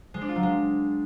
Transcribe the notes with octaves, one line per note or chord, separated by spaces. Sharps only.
G#3
D4
F4
F#3
G#3